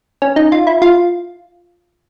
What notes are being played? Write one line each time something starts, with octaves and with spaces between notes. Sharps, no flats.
C#4
D#4
F4
E4
F4